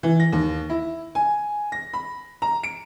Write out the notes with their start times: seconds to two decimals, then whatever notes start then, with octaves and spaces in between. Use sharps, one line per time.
0.03 E3
0.20 A#6
0.33 D#2
0.70 E4
1.15 G#5
1.72 A#6
1.93 B5
2.42 A#5
2.63 D7